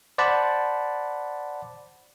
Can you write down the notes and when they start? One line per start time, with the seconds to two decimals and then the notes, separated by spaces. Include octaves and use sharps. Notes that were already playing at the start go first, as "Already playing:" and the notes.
0.18 C5 D5 F#5 A5 B5